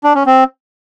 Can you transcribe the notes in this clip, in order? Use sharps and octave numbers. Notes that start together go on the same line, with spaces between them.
D4
C#4
C4